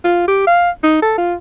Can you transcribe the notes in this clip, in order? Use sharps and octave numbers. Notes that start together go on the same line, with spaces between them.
F4
G4
F5
D#4
A4
F4